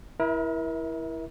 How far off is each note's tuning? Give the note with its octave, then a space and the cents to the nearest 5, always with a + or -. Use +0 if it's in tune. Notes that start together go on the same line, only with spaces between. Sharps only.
E4 +0 A#4 +35 E5 -30